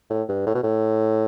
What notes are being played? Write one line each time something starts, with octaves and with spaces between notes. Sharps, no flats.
A2
G2
A2
B2
A2